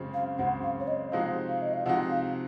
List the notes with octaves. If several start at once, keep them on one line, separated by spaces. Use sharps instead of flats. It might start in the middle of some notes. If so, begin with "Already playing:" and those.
Already playing: F#2 C#3 G#3 C4
F5
F#2 C#3 G#3 C4 F#5
F5
C#5
D#5
C3 F3 G#3 D#4 F#4 F5
F5
D#5
F5
C3 F3 G#3 D#4 F#4 F#5
F5